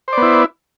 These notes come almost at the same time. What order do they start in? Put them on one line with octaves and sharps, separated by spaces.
C5 D5 B3 E4